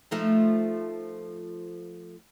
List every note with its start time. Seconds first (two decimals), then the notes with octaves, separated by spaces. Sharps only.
0.11 F3 A3 D#4